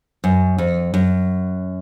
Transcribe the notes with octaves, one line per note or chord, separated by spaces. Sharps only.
F#2
F2
F#2